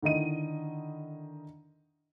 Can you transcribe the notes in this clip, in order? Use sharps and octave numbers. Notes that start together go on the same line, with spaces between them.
D3 D#3 E4 D#5 D#7